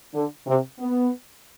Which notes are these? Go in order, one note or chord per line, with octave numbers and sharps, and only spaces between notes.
D3
C3
B3